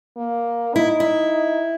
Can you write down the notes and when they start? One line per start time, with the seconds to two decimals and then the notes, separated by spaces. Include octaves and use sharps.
0.17 A#3
0.75 D#4 E4
1.00 E4